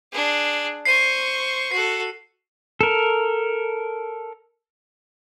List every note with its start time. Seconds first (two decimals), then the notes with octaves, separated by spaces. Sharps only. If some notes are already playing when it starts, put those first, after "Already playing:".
0.12 D4 G#4
0.85 C5 C#6 C7 D#7
1.72 F#4 A4 C7
2.81 A4 A#4